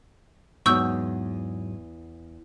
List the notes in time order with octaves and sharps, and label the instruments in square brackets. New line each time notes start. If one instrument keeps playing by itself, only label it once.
[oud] E2 [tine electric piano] G#2 F#3 [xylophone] C#6 E6 G6